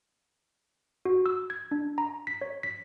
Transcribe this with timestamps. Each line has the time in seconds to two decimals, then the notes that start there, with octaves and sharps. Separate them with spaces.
1.05 F#4
1.26 E6
1.50 G#6
1.71 D4
1.98 A#5
2.27 B6
2.41 C#5
2.63 B6